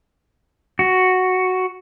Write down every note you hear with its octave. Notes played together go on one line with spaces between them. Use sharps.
F#4